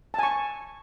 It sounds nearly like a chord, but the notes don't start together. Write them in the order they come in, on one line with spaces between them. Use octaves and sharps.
A5 G#5 C#6